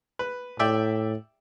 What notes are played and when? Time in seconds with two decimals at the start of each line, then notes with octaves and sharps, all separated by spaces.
0.19 B4
0.59 A2 D5 E5 G5